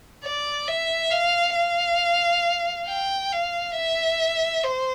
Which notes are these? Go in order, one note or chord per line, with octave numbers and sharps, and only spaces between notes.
D5
E5
F5
F5
G5
F5
E5
C5